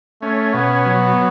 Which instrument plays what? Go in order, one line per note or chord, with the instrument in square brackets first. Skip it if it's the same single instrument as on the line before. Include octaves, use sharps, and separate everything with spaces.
[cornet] A3 [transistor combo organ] C#4
[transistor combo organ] B2 [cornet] B3
[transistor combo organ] F#3